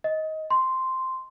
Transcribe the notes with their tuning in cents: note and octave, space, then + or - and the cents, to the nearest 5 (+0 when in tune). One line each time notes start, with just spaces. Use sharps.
D#5 +15
C6 -5